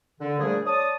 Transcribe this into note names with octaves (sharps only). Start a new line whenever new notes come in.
D3
A#2 F3 G3 A3 D4 G#4
C#5 D5 A5 D#6